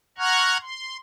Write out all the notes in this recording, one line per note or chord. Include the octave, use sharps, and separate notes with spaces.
F#5 A#5 C#6 F6 F#6 G#6
C6